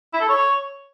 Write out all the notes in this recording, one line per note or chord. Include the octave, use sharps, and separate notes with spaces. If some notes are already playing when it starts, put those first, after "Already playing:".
E4
A4
C#5